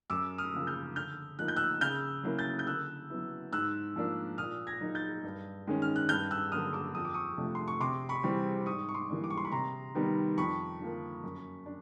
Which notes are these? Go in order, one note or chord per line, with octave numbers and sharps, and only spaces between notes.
F#2 D6 E6
D#6 F6
C#3 F3 A#3
F6 G6
D3 F6 G6
F3 A#3 D#4 F#6
G6
E6 F#6
C#3 F6 G6
F#3 A#3 C#4 E4
G6 A6
G6
D3 E6 F#6
F#3 B3 E4
G#2 E6 F#6
F3 A#3 D4
A#2 D#6 F6
G#6 A#6
F#3 A#3 D#4
G6 A6
G2
D#3 G#3 C#4
F6
F#6
G2 F6 G6
E6 F#6
D3 F#3 A#3 D#6 F6
D6 E6
F2 D#6
D6
C#6 D#6
C3 F3 A3 D4
C6
C#6
C3 C6 D6
B5 C#6
E3 G3 C4
G#2 C#6 D#6
C#6
C6 D6
E3 G3 A#3 D4
D6
C#6
C6
B5 C#6
C3 A#5 C6
D#3 G3 B3
F2 B5 C#6
D3 F3 A#3
F#2
D4